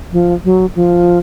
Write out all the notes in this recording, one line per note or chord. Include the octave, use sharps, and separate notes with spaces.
F3
F#3
F3